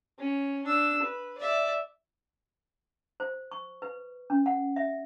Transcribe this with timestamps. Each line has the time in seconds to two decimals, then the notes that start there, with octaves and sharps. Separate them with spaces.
0.19 C#4
0.65 D4 E6
1.02 B4
1.38 D5 E5
3.20 C5
3.51 C#6
3.82 B4
4.30 C#4
4.46 F#5
4.76 E5